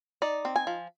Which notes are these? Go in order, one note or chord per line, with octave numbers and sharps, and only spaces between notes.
D#4 D5
C4
G#5
F3